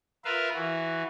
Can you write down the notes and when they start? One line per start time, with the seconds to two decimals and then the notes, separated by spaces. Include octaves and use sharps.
0.25 F4 A#4 B4 E5 F5
0.54 E3 F#4